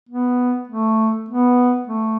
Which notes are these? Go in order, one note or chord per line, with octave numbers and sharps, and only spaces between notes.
B3
A3
B3
A3